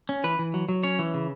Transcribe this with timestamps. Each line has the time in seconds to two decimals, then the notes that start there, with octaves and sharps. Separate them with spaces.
0.09 C#4
0.24 E3 B4
0.39 E3
0.54 F#3
0.69 F#3
0.83 C#4 C#5
0.99 E3
1.14 C#3